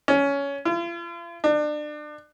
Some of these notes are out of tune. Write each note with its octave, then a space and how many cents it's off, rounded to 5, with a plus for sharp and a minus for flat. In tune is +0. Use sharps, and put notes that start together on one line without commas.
C#4 +15
F4 -40
D4 +30